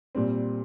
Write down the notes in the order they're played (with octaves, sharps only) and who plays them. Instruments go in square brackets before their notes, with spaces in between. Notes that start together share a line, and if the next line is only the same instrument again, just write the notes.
[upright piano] A#2 G3 C4